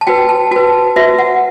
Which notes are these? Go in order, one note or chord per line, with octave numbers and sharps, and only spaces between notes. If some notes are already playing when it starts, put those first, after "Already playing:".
A5
F#4 B4 G5
A5
F#4 B4 A5
F#4 B4 E5
F#5